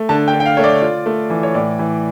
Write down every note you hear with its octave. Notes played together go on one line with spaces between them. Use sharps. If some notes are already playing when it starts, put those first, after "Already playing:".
Already playing: A3
D3 A5
G5
D3
G5
F5
A3 C#5
D5
F4 D5
A3
E3
C#5
A2 D5
E3